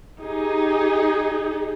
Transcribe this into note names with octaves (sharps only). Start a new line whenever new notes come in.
D#4 G4 G#4